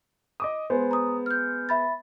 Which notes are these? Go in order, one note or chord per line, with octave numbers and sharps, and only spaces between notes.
D#5 D6 D#6
G#3 B3 C5
A#5 D#6
F6 G6
E5 B5 A6